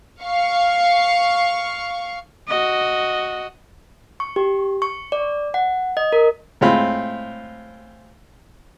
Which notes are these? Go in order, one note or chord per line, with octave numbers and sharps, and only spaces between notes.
F5 C#6
F#4 D#5
C#6
G4
C#6
D5
F#5
D#5
A#4
A2 G#3 C4 F4 B5